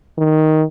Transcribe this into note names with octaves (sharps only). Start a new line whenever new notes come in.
D#3